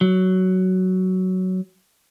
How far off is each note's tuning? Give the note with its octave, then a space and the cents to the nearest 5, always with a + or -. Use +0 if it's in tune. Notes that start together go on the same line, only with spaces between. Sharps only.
F#3 +10